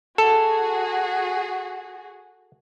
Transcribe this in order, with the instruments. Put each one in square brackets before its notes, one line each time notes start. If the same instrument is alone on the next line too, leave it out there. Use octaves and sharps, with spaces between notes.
[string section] F#4 G#4 [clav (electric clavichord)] A4